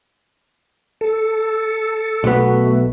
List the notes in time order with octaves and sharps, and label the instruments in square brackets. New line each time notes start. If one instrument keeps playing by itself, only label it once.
[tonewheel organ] A4
[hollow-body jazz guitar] B1 B3 [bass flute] A3 [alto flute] F#4